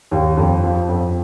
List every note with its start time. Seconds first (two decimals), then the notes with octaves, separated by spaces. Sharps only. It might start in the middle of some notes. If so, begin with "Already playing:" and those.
0.11 D#2
0.37 F2
0.63 F3
0.89 F2